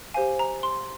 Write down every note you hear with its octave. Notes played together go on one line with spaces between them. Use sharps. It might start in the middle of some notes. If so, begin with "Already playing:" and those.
G4 C5 F5 G#5
A#5
C6